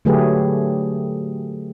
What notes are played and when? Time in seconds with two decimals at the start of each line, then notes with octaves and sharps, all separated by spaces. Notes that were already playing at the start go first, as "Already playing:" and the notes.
0.05 D3 F#3 A3 G4 G#4 B4